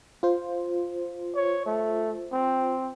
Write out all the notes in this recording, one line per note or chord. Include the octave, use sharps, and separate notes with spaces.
F4 C5
C#5
A3
C4